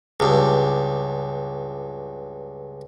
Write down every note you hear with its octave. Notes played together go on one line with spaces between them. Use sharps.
C#2 G2